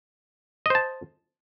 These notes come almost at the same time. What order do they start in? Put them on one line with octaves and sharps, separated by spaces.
D#5 C5 A5